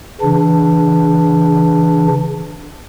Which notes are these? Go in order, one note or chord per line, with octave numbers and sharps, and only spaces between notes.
C#3 E3 D4